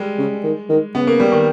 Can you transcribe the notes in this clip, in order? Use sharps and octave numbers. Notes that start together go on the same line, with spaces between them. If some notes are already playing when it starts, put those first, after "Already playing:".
Already playing: G3 G#3
C#3
D#3
D#3
C#3 B3
A#3
G3
D#3